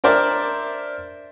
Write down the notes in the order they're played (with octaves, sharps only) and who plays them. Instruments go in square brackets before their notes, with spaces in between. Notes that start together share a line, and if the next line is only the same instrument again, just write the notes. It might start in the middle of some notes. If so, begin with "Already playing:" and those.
[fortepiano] D4 A#4 C5 D5 E5